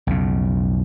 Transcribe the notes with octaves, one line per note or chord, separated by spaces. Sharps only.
B1 F2 C#3